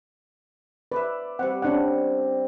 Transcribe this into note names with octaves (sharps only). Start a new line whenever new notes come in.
B4 D5 E5
G3 C4 F#5
C#4 D4 F#5